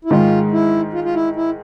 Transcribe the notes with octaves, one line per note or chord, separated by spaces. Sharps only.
E4
G#2 D#3 G#3 F4
E4
F4
F4
E4
E4